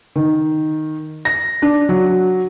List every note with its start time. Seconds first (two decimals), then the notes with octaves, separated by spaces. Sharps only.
0.16 D#3
1.25 A#6
1.62 D4
1.89 F#3